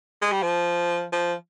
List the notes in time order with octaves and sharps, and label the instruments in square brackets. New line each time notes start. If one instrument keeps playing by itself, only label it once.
[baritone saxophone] G#3
G3
F3
F3